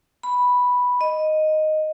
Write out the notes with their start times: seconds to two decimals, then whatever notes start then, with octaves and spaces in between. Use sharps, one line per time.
0.23 B5
1.01 D#5